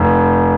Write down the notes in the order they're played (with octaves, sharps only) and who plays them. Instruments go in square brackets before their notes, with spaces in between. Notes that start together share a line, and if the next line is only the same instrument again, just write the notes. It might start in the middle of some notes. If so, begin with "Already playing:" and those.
Already playing: [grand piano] F1